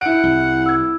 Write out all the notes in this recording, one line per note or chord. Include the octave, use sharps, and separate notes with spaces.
E4 F#5 D7
C2
E6 G#6